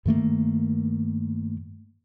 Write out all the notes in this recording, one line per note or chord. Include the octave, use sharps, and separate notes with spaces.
G2 D#3 A3 A#3